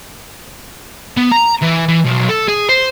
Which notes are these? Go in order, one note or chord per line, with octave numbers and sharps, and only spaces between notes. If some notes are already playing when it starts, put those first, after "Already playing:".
B3
A#5
E3
E3
B1
A4
G#4
C5